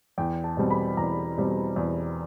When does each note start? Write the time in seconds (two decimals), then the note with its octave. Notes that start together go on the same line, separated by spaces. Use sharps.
0.18 E2 G5
0.44 A5
0.57 B2 G3 C4
0.70 B5
0.97 E2 A#5
1.38 B2 G3 C4
1.76 E2